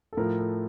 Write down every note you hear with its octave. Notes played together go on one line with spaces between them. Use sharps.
A4
A2 F3 A#4
A4